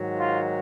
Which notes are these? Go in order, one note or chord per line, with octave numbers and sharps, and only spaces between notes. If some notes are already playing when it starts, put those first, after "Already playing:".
Already playing: G#2 D#3 F#3
F4